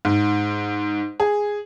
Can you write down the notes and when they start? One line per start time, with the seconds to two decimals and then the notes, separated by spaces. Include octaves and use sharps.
0.05 G#2
1.20 G#4